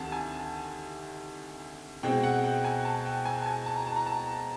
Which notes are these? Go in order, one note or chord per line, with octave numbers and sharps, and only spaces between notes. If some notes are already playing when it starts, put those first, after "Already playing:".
Already playing: D2 C3 D#3 A5
G#5
B2 G#3 C4 G5
F#5
G5
G#5
A5
G5
G#5
A5
G#5
A5
A#5
A5
A#5
A5